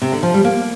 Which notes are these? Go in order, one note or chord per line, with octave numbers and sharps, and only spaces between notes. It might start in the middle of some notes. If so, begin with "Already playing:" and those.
C3
D3
F3
G3
A#3